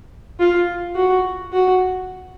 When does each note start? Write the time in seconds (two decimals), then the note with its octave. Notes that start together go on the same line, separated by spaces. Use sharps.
0.39 F4
0.95 F#4
1.52 F#4